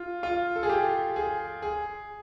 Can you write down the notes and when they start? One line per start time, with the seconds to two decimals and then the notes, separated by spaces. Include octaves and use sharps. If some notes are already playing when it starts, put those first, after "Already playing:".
Already playing: F4
0.23 F4
0.56 A4
0.63 G#4
0.69 G4
1.16 G#4
1.62 G#4